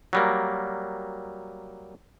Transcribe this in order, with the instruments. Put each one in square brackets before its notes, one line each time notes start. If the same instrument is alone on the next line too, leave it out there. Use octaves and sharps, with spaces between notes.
[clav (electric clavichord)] F#3 G3 A#3